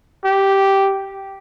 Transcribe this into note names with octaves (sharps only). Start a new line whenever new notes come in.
G4